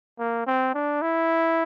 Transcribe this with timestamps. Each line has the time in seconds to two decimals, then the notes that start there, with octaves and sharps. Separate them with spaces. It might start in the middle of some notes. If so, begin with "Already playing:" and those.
0.19 A#3
0.47 C4
0.74 D4
1.02 E4